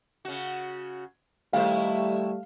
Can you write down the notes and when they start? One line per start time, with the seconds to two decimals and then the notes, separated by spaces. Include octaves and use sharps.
0.25 C#3 F#4
1.53 D#3 G3 A3 E4 C5 F5